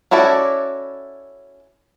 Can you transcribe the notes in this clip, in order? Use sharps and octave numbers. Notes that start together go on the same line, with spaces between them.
C#4 E4 F#4 A4 D5